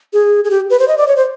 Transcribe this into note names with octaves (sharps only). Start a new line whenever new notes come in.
G#4
G#4
G4
B4
C5
D#5
D5
C#5
C5